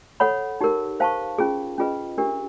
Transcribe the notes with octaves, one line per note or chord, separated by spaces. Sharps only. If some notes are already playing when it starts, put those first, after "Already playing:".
A4 C#5 F#5 B5
D#4 G4 A#4
C5 F5 A5 C#6
C#4 F4 G#4
C#4 F4 G#4 B4 D#5
D4 G4 A#4